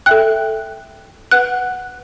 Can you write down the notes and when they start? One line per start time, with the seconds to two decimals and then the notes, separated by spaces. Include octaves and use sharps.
0.06 A4 E5 G5 F#6
1.31 B4 F#5 F#6